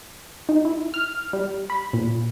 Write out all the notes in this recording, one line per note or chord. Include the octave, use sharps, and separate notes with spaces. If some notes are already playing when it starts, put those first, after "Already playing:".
D#4
E4
F6
G3
B5
A#2